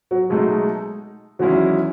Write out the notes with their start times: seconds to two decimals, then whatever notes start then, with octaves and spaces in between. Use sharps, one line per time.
0.11 F#3
0.30 B2 F#3 G#3 A3 D#4
1.39 E2 D#3 F#3 G#3 C#4 E4